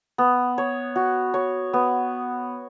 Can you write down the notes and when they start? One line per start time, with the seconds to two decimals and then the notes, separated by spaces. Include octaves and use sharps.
0.18 B3
0.58 C#5
0.96 F#4
1.34 C#5
1.73 B3